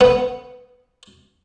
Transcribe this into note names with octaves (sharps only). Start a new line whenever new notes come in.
B3